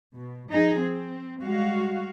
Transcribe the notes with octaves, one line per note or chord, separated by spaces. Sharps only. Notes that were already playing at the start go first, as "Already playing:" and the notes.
B2
F3 D#4 G#4
C4
G3 G#3 F#4 F5